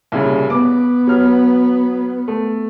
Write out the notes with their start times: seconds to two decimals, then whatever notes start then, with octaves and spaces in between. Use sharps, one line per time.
0.12 C2 A#2 C#3
0.50 B3 D6
1.07 F#3 F6
2.28 A3